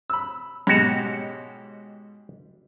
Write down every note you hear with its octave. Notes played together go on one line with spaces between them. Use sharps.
B5 E6
G#2 B2 F#4 G4 C#5